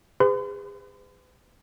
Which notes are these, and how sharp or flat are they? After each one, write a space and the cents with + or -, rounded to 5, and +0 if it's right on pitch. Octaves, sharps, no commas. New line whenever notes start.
G#4 -35 B4 +40 C6 -45